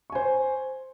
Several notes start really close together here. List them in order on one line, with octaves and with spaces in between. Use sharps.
C#6 G#5 C5